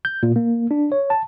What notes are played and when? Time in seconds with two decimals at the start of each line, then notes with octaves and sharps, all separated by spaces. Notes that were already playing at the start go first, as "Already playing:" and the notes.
0.05 G6
0.23 A#2
0.36 A#3
0.71 D4
0.92 C#5
1.10 A5